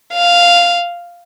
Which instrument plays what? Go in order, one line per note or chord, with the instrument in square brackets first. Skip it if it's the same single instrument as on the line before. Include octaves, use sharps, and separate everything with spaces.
[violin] F5